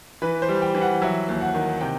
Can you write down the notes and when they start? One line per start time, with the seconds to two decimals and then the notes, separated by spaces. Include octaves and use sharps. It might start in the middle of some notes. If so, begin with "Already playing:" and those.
0.22 E3 B4
0.42 C5
0.49 G3
0.62 G5
0.74 E3
0.81 F#5
1.02 F#3 E5
1.28 D#2
1.41 F#5
1.54 D#3
1.81 C3 G5